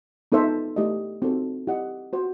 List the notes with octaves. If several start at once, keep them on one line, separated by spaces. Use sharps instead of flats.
B3 D#4 A4 C5 E5
A3 E4 G4 D#5
C4 D#4 F#4 A4
E4 G4 D#5 F#5
F#4 C5 F#5